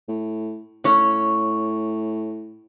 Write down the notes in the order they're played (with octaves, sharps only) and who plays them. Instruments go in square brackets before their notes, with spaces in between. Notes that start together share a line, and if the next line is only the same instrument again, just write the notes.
[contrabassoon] A2
[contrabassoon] A2 [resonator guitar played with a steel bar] C#4 C#5